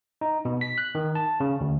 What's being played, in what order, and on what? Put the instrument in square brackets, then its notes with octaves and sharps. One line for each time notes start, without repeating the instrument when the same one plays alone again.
[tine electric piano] D#4
B2
B6
F#6
D#3
A5
C#3
D2